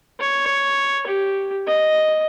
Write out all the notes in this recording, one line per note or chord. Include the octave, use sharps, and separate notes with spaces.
C#5
G4
D#5